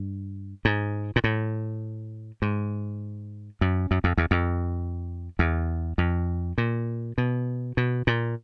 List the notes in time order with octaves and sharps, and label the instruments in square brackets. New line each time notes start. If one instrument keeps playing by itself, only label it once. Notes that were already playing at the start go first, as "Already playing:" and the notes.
Already playing: [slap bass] G2
G#2
A#2
A2
G#2
F#2
F#2
F2
E2
F2
E2
F2
A#2
B2
B2
A#2